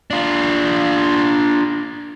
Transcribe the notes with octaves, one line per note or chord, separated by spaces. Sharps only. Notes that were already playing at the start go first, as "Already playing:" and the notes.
D4 F4